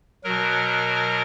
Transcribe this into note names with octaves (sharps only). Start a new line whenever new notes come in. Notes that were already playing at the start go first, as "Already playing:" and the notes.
B2 F#3 A#4